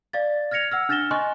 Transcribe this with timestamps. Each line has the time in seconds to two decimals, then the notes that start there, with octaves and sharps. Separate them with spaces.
0.13 D5 F5 A6
0.51 F6 G#6 A#6 C#7 F7
0.71 F#5 E6 F6
0.89 D4 F6 A6 A#6 E7 G7
1.11 D#5 G#5 C6 C#6 F#6